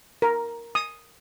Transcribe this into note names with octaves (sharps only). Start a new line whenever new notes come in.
A#4
D#6